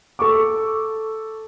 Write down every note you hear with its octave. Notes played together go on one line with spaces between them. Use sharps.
A4 C#6 D6